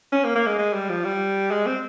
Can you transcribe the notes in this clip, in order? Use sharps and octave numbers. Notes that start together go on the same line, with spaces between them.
C#4
A#3
A#3
G#3
G#3
G3
F3
G3
G#3
C4